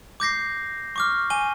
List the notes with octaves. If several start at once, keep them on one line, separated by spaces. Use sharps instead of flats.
D6 G6 A#6 C7
C#6 D6 F6
G#5 D#7 G7